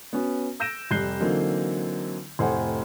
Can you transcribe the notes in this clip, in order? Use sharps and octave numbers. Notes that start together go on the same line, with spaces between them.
B3 C#4 F#4
E6 G6 A#6 D7 E7
F1 G3 F#6 G6 C7 G7
D3 E3 F#3 A#3 C4 D#4
F1 A2 C5 F#5 G#5